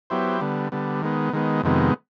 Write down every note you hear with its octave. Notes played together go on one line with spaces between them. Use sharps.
F#3 B3 E4 G4 C5
D3 G3 B3
D3 G3 B3
D#3 G#3 B3
D#3 G#3 B3
F2 C3 D#3 G#3 B3